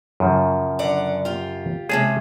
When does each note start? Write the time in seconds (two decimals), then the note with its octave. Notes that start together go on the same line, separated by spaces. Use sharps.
0.20 F#2 C#3 F3
0.79 D3 D5 F#5
1.25 F4 G4
1.89 C3 G#3 C#4 G#4 A5